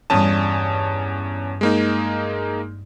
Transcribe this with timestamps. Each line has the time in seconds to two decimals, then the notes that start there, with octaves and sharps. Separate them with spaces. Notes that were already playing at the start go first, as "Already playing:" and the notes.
0.10 E2 G2 C#4 A5 D#6
1.61 G#3 A#3 D#4